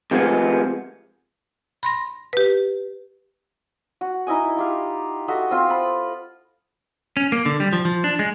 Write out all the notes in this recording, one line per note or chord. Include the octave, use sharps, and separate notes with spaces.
C3 D#3 F3 G#3 A3 B3
B5 C6 A#6
G4 B4
F#4
D#4 E4 D#5 G#5
F4 G4 F5
F#4 A4 D#5 E5
C4 F4
B5
C#4
A#3
D3
G3
F3
F3
D4
G#3